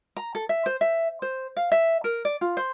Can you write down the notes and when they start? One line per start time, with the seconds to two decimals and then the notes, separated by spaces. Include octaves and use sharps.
0.17 A#5
0.35 A4
0.49 E5
0.66 C5
0.81 E5
1.22 C5
1.57 F5
1.72 E5
2.04 A#4
2.25 D5
2.41 F4
2.57 C5